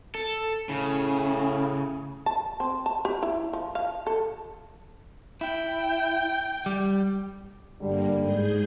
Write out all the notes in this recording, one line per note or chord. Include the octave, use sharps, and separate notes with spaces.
A4
A2 C#3
A5
C4
A5
G4
E4
F3
F5
A4
E4 G5
G3
G2 D3 G3 A#3
G#2 G#4 G6